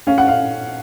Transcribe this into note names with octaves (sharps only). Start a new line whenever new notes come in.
C#4 F5
F#5
F5